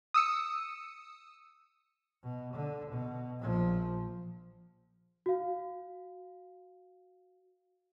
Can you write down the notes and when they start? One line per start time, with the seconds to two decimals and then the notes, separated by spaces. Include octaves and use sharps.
0.14 D#6 E6 C#7
2.23 B2
2.53 D3
2.91 B2
3.40 A#1 F3
5.26 F#4 F5